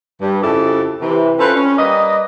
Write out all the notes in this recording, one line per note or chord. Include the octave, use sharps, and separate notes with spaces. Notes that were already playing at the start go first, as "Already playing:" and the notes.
G2
F2 C#3 F3 E4 G4 A4
C3 E3
C4 C#4 F4 A4 B4
C#4
G3 A#3 B4 D5 D#5